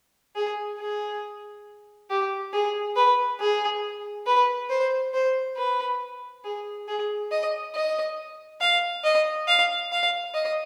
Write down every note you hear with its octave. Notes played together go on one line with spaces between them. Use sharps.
G#4
G#4
G4
G#4
B4
G#4
B4
C5
C5
B4
G#4
G#4
D#5
D#5
F5
D#5
F5
F5
D#5